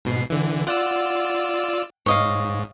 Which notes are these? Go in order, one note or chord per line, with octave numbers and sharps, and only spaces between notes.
G#2 B2 C7
D3 E3
F4 D5 F#5 E6
G#2 C#5 D#5 F5